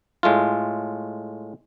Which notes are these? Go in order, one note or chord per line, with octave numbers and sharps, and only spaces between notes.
A2 G#3 A3 F4